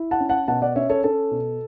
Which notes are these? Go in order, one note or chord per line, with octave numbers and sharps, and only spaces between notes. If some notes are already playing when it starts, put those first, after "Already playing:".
Already playing: E4
F#5 A5
C#4
F#5 A5
B2 F#5 A5
D5 F#5
C#4 C#5 E5
A4 C#5
C#4 A4
B2